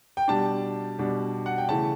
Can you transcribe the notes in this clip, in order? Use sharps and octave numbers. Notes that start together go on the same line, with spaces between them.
G5
B2 G3 D4 A5
B2 G3 D4
F#5
G5
C#3 E3 A3 A5